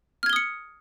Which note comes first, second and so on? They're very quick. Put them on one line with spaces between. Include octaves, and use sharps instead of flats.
F6 G#6 G7 D#6 C#7